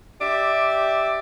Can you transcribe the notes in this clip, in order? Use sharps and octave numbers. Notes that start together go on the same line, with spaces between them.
G4 D5 E5